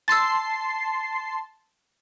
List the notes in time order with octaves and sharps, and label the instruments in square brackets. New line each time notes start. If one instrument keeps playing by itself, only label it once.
[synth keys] A5 C6 C7 [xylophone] E6 A6